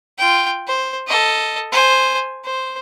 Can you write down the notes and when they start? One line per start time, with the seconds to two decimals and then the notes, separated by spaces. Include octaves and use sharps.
0.18 F4 G5
0.67 C5
1.07 A4 D#5
1.72 C5 G#5
2.44 C5